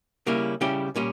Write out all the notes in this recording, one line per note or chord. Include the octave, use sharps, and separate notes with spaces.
C#3 G3 A#3 C#4 E4
C#3 G3 C#4 E4 G4
A#2 G3 C#4